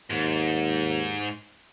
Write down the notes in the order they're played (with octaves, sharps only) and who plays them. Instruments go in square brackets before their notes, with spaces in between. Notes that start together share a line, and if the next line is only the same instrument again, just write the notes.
[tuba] D#2 [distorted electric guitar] G#2